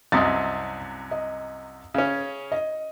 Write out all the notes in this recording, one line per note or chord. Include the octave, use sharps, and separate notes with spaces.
C2 F#2 C3 D#5 D#6 A6
D#5
C#3 C#4
D#5